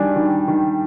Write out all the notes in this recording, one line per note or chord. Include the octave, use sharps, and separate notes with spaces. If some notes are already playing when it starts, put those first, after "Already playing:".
Already playing: D#3 G3 D4 G#5
D#3
D#3